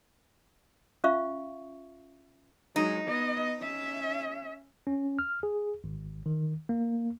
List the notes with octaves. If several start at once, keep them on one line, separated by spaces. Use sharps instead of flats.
C#4 F4 E5 F5 C#6
F#3 G#3 D#4
B3 D#5
C#4 E5
C#4
F6
G#4
G#1
D#3
A#3